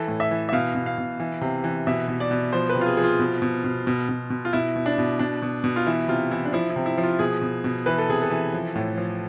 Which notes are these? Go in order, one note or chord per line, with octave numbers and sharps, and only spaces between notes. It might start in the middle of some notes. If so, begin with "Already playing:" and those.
Already playing: E3 A4
A2
E5
E3
E5
B2 F5
B2
F5
B2
E3
C3
E3
B2 E5
B2
D5
B2
F3 C5
B4
C3
F4
G#4
F3 G#4
F4
B2
B2
B2
B2
B2
B2
F4
B2 E4
B2
D4
B2
B2 D4
B2
B2
F4
E3 E4
C3 F4
E3 E4
D4
F3 E4
E4
C3
E4
F3
F4
B2 G#4
B2
B2
E3 B4
A4
C3 G#4
A4
E3
F3
A2
F3